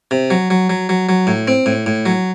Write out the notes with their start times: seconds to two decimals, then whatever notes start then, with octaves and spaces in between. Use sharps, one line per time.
0.11 C3
0.30 F#3
0.50 F#3
0.70 F#3
0.89 F#3
1.09 F#3
1.27 A2
1.48 C4
1.66 A2
1.86 A2
2.06 F#3